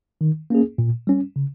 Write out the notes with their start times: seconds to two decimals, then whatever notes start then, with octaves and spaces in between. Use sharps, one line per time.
0.21 D#3
0.50 A#3 C#4 G#4
0.78 A#2
1.07 G3 C#4
1.36 C#3